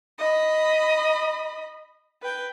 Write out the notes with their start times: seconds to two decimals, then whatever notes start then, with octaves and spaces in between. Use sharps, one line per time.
0.19 D#5 B5
2.22 B4 G5